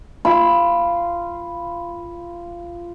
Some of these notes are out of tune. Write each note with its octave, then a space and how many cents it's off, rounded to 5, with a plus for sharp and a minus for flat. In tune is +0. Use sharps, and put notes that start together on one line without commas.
F4 -15 B5 +0